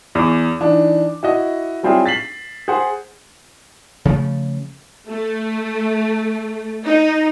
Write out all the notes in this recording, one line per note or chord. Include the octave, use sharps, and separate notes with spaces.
E2 D6
E3 D4 D#4
E4 F#4 D#5
F#3 G3 C4 E4 F4 G#4
A6 B6 C7 F#7
G#4 C5 F#5
C#3 F3 A3
A3
D#4